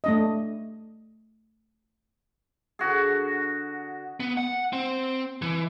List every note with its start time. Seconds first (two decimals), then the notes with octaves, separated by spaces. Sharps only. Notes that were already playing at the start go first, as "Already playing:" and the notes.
0.04 A3 D4 D#5
2.79 D3 F#4 G#4
4.20 B3
4.37 F#5
4.73 C4
5.42 E3